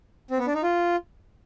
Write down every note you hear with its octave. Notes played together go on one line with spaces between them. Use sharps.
C4
B3
D4
D#4
F4